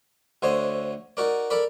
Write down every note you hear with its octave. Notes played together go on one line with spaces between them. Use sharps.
D2 D3 C5 C#5 D#5
D#4 F#4 A#4 D5
A4 A#4 D5 B5